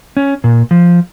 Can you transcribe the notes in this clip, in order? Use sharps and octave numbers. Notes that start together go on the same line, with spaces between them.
C#4
A#2
F3